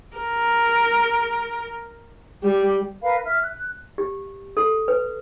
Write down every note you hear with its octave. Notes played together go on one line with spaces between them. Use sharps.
A#4
G3
A#4 B4 F5 B5
E5 F6
F#6
G4
A4
B4